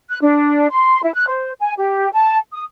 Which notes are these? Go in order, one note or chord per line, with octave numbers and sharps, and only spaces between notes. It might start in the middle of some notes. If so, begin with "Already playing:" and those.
F#6
D4
C6
E4
F#6
C5
G#5
G4
A5
D#6